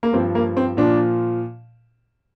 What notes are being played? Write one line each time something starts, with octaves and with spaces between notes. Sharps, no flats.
A#3
G2 F3 C4
A#3
C4
A#2 F3 D4